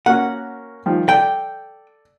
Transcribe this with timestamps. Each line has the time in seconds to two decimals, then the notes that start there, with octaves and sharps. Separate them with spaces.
0.06 A#3 C#4 F#4 F#5
0.86 D#3 F3 G3
1.09 A4 D5 G5